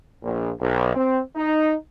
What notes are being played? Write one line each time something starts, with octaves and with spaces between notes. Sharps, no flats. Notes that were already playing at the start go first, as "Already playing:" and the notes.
A#1
B1
C4
D#4